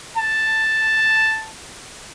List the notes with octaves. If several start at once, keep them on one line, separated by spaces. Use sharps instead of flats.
A5